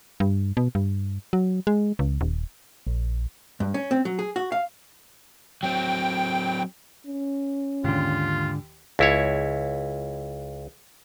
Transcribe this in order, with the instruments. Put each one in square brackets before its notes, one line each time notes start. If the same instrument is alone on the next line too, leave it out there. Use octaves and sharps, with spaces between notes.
[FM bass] G2
B2
G2
F#3
G#3
C#2
D#1
[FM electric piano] A#1
[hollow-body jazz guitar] G2
C#4
C4
F#3
G#4
F#4
F5
[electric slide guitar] F#3 C4 [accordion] G5
[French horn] C#4
[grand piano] D#2 [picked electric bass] G#2 D3 [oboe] F4
[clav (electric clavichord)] C#2 E4 C#5